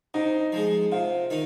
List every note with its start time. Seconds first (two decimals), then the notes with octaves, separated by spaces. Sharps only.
0.14 C3 D#4
0.52 F3 G#3
0.92 C3 F4
1.30 D#3 D#4